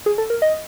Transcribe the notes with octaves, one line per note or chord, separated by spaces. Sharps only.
G#4
A4
A#4
D#5